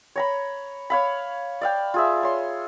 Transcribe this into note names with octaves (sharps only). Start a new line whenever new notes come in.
C#5 A#5 B5
C#5 F5 B5
D5 F5 G5
F4 G#4 E5
C#5 C6